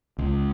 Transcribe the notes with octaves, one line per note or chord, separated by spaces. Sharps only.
C#2